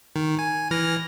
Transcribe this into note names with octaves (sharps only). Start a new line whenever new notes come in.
D#3
G#5
E3 F6 A#6